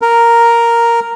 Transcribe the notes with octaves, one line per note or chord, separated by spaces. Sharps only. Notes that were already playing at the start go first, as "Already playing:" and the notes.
A#4